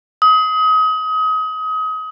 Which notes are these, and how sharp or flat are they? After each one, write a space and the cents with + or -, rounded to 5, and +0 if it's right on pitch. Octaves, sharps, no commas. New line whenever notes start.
D#6 +30